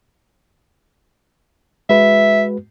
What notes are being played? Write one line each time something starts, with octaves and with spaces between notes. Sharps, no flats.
G#3 F#4 B4 E5